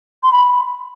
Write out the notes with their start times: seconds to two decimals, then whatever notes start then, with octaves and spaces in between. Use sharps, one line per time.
0.23 C6
0.32 B5